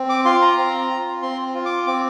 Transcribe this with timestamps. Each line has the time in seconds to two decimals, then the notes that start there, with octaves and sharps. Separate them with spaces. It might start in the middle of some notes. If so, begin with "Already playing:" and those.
Already playing: C4
0.09 D6
0.25 F4 C6
0.42 A#5
0.57 C4
0.90 F4
1.22 C4 C6
1.54 F4
1.65 D6
1.86 C4 D6